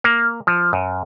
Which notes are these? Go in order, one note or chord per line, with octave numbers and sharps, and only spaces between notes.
A#3
F3
F#2